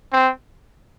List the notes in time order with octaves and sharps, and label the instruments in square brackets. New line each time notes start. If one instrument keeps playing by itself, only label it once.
[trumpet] C4